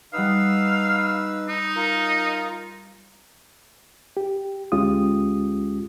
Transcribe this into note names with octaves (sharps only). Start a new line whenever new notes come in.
G3 D#4 B4 F5 F#5 D#6 E6
D#4
F4 A#4 A#5
G4
D2 G#3 C#4 F4 G4 D#6